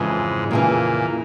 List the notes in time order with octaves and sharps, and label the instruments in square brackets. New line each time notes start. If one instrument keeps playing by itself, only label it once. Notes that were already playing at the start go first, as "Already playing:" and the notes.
Already playing: [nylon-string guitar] F2 C#3 E3 [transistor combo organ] G#2
[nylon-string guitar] F2 C#3 E3 [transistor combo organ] A#2